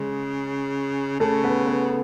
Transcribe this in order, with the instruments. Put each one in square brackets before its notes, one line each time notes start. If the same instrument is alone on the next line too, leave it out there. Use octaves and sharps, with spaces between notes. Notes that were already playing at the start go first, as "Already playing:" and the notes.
Already playing: [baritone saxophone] C#3 [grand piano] G#3
[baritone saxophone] C#3 [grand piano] A3 A4
[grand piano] B3 B4
B3 B4